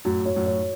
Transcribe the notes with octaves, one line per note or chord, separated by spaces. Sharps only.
F#2 A2 F#4
C#5
F#2 A2
C#5